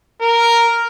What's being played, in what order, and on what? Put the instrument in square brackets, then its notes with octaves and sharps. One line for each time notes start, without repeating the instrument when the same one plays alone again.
[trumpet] A#4